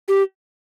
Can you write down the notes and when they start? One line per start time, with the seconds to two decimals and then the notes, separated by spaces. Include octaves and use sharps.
0.08 G4